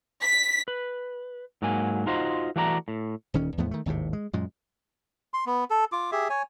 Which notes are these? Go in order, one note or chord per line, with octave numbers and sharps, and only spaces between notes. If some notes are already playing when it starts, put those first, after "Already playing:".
B6
B4
G#2 F#3 A#3 G#5
D#4 F4 F#4 C5 D#5
E3 A3 F#4 D5 A5 A#5
A2
D#1 D2 D#3 C#4
E2 A2 F3 B3
D#3 A3
G#1 D#2 A2 C3
G#3
F#2 A#2 G#3
C6
B3
A4
F4 D6
G4 G#4 E5
C#5 G#5